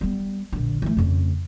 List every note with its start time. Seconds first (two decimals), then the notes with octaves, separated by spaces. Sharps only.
0.01 G3 B3
0.52 A#1 D3
0.82 E3 A3
0.97 F2 C#3